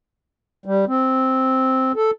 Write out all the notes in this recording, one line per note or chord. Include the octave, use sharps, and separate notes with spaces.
G3
C4
A4